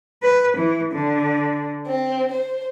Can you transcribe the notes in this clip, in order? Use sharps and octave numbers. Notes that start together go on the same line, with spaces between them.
B4
E3
D3
C4
C5